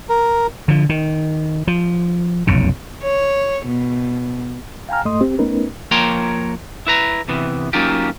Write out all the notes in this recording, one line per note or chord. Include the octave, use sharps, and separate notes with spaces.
A#4
D3 F3
D#3
F3
F1 B1 F#2 C#3
C#5
B2
F5 G5 G#5 A#5 F6
G#2 A3 D#5 C6 D#6
C4 G4
A3 B3 C#4 D#4 A#4 B4
F3 A#3 C#5 G5 A#5 C6
E4 B4 A#5
C3 E3 B3
F#3 A#3 C#4 D#4 F4 G4